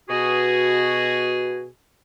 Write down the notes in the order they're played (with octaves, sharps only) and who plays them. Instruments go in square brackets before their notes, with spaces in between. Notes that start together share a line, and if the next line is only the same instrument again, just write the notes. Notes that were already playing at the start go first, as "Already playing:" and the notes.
[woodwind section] B2 F#4 G#4